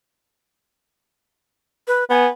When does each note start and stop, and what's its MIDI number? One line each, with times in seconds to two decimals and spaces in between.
1.88 2.04 71
2.10 2.26 59
2.10 2.28 80